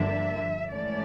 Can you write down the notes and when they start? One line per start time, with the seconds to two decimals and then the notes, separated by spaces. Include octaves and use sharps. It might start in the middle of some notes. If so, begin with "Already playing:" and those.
Already playing: G2 D3 F3 A#3 D4 E5
0.70 G#2 E3 A3 C#4 D5